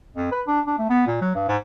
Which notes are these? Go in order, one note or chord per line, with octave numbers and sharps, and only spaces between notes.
F2
B4
D4
D4
A3
B3
A#2
F#3
G2
G#2